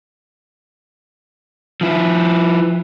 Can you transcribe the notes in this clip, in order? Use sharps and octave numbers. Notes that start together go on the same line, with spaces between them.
F3 E4